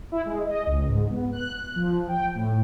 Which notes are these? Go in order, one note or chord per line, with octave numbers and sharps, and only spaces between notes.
E4
G#3
D#5
C#2
G#2
B3
F#6
F3
G5
A2